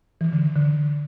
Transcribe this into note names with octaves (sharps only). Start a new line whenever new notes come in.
E3
D3
D3